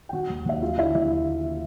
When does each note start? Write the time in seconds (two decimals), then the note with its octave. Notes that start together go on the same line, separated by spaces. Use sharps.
0.09 G5
0.13 D#3 F#4 F#5
0.30 D#2
0.46 D#2 E5
0.61 F#3 F4 F5
0.77 D3 E4 E5
0.94 D#2 E4 E5